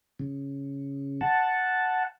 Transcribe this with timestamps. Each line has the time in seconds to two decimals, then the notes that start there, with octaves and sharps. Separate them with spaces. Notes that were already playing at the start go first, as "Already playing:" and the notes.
0.19 C#3
1.21 F#5 A5